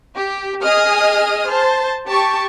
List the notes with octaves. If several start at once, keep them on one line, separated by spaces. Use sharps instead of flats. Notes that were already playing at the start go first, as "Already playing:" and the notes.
G4
G#4 D#5 D#6 F6
C5 A5
G4 A5 C#6